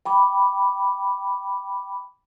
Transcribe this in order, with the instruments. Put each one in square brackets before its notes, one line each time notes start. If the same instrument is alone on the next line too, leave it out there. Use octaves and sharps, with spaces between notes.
[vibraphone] G5 B5 D6